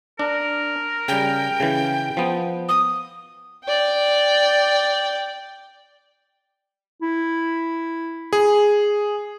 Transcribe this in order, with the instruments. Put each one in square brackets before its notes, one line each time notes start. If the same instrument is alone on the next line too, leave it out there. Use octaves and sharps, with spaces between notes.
[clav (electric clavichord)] D4 [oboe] A#4
[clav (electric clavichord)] C#3 G3 [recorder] G5
[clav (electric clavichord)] C#3 E3
F3 B3
[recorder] D#6
[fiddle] D5 G5
[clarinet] E4
[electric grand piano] G#4